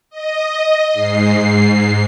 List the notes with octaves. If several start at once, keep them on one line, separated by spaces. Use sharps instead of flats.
D#5
G#2 C7